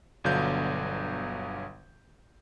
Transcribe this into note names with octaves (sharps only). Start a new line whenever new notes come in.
G1 B2 D3 F#3 F5 G6